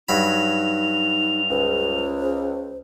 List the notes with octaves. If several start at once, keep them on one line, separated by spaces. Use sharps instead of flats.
G2 F#3 D#4 B5 F7
C#2 C5